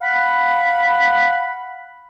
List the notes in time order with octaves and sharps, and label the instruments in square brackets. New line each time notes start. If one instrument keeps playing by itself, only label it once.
[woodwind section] F5 F#5 B5